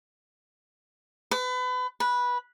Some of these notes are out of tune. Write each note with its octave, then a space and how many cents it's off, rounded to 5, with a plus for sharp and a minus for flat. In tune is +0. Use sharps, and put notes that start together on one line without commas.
B4 +30
B4 -15